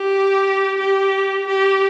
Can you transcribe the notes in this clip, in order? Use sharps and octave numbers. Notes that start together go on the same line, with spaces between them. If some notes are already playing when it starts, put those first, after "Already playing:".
Already playing: G4
G4
G4